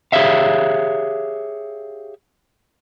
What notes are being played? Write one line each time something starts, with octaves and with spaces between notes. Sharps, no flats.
G4 G#4 A#4 C#5 E5 F5